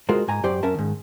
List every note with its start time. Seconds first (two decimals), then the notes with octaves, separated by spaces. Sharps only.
0.09 G#3 F4 F#4 G#4 A#4 C5
0.28 G#2 G#5 A#5
0.43 F#2 G4 C5 D5
0.63 F#2 C#4 A#4 E5 A5
0.74 G#2 D#3